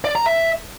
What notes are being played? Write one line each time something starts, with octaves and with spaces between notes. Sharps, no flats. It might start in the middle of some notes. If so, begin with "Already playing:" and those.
D5
A#5
E5